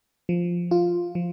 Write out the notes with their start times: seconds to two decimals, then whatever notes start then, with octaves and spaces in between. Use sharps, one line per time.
0.29 F3
0.71 F4
1.15 F3